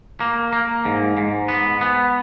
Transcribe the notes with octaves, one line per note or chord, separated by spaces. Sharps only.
A#3
A#3
G#2
G#2
B3
B3